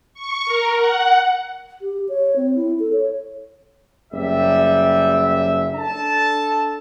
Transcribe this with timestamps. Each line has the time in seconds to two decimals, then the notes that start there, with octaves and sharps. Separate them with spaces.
0.14 C#6
0.45 A#4
0.76 F#5
1.81 G4
2.09 C#5
2.36 C4
2.55 E4
2.80 A4
2.93 C#5
4.13 F#1 G3 E5
5.74 D4 A4 A5